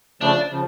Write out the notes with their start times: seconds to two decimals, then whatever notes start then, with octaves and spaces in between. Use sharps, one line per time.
0.21 C#3 F3 A3 D4
0.51 C#3 F3